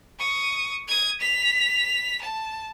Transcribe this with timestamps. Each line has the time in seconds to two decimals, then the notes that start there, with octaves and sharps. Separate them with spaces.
0.19 C#6 D#6
0.87 D#6 G#6
1.20 B6 F7
2.21 A5